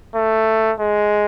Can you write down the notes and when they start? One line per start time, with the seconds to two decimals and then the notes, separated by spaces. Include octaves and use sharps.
0.15 A3
0.80 G#3